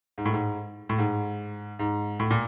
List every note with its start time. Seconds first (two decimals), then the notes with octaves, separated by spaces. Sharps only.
0.18 G#2
0.25 A2
0.33 G#2
0.89 A2
0.98 G#2
1.79 G#2
2.20 A2
2.31 A#2